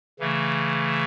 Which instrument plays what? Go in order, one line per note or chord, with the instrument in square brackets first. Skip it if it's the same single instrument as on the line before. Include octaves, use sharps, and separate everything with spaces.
[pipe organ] C#3 E3 A3